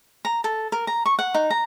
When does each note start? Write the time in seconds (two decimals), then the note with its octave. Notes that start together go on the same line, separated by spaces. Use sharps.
0.25 A#5
0.44 A4
0.72 A#4
0.87 A#5
1.06 C#6
1.19 F#5
1.34 D#4
1.50 A#5